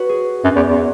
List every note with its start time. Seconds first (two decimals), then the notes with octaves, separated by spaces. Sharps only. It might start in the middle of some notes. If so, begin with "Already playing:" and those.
Already playing: F#4 B4 C#5
0.09 G#4
0.44 F#2
0.56 E2
0.68 E2